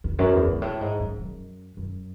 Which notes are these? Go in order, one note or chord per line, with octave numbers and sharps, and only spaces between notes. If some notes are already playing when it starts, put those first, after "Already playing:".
E2
F#2
E2
G#2
A2
G#2
F#2
F#2
F#2